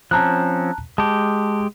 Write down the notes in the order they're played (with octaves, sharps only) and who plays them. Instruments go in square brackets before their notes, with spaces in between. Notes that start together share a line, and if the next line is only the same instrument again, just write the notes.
[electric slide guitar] F3 C4 C#4 [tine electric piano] A5 A#5 F#6
[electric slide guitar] G#3 G4 [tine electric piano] A5